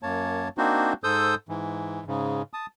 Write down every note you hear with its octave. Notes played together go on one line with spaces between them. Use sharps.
F#2 A#3 C#5 A5
A#3 C4 D4 D#4 F#4 C5
G#2 A4 C5 D#6 E6 G6
G#2 E3
G#2 C#3
A5 D#6